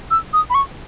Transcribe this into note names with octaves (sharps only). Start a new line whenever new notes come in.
E6
D#6
B5
C#6